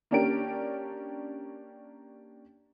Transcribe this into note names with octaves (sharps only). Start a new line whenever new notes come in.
A#3 C#4 D4 G4 A#4 D7